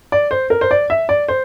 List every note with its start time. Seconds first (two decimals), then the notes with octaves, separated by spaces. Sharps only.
0.12 D5
0.31 C5
0.50 A#4
0.61 C5
0.71 D5
0.90 E5
1.09 D5
1.28 C5